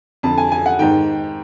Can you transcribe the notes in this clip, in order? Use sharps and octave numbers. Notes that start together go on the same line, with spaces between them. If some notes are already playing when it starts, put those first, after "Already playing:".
F2 D3 A5
G#5
G#5
F#5
G#2 D#3 G5